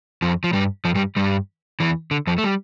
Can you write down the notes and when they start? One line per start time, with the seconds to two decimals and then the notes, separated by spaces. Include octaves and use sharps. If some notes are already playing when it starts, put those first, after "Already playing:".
0.22 F2 F3
0.44 F3
0.53 G2 G3
0.85 F2 F3
0.95 G2 G3
1.16 G2 G3
1.80 E2 E3
2.11 D3
2.27 F2 F3
2.38 A3
2.44 G3